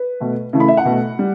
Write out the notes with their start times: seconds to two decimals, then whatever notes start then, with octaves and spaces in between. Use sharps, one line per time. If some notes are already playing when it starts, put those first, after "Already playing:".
Already playing: B4
0.20 B2 A3
0.53 C#3 E3 A3
0.60 B5
0.68 E5
0.77 F#5
0.85 B2 A3
1.19 G3